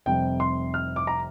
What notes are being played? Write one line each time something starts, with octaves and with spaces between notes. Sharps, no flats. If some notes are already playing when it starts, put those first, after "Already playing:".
F1 F2 C3 G3 G5
C6
F6
D6
A#5